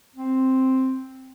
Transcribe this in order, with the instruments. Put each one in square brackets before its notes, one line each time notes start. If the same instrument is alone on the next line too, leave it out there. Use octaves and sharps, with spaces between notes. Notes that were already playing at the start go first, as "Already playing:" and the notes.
[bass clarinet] C4